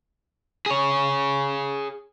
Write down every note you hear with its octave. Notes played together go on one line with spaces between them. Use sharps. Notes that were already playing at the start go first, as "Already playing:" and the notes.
G#4 C#5